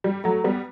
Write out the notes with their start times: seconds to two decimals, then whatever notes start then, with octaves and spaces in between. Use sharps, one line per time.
0.04 G3
0.24 F#3 A3
0.44 G3 B3